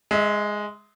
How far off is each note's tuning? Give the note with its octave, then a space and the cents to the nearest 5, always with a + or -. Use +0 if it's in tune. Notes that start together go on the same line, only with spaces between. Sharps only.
G#3 +0 E5 -30